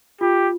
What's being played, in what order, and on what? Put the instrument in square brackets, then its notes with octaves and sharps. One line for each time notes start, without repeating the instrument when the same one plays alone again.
[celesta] F4 [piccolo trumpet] G4